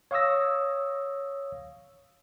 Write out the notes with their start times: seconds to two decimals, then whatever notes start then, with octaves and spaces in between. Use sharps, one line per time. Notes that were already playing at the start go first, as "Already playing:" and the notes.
0.11 C#5 F5 C#6 D#6 E6 A#6